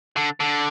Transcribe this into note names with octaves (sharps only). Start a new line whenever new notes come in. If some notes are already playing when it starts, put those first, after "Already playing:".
D3
D3